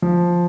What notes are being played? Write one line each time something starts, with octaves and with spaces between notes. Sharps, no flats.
F3